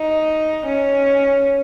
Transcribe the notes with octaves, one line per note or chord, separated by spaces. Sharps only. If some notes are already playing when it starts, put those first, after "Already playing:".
Already playing: D#4
C#4